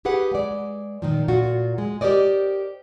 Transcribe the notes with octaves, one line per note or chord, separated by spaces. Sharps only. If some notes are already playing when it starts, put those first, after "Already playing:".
G4 G#4 B4 F#5
G#3 D5
A#2 D#3 F3
A#2 F4 F#4
G#3
G4 A#4 C5 D5 D#5